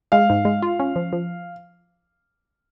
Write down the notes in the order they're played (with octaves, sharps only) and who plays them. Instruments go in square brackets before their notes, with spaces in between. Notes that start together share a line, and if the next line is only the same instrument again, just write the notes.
[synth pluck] G#3 [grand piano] F5
[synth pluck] G#2
G#3
F4
C#4
F3
F3